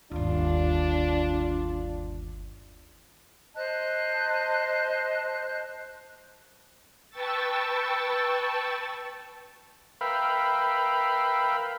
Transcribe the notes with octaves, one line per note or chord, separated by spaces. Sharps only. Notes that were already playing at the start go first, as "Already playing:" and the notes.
G1 D#2 D4 F4
C5 D#5 A5 F#6
B4 G5 A5 C#6 E6 A6
A#4 B4 E5 F5 G5 B5